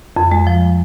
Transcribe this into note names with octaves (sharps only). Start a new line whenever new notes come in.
F2
G#3
F3